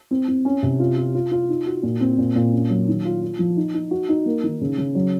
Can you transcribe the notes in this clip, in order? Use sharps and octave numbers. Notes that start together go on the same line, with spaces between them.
C4
C4
C#4
C3
F4
F4
F4
F4
D#4
F#4
A#2
C4
A#2
A#2
C#4
F#3
D#3
F4
F4
F3
D#4
D#4
F#4
D#4
A#3
D#3
C#3
C#3
F#3